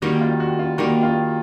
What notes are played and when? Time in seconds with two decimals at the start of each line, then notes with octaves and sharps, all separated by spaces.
0.02 D#3 G3 A#3 F#4
0.21 F4
0.40 F#4
0.59 F4
0.78 D#3 G3 A#3 F#4
1.03 F4